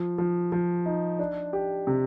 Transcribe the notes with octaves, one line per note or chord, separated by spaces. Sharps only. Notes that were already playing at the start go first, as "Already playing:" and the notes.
Already playing: F3
F3
F3
D#4
D4
G4
C3